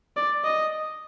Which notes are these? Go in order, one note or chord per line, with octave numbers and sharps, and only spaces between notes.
D5
D#5